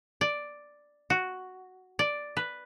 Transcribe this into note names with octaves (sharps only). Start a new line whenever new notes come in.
D5
F#4
D5
B4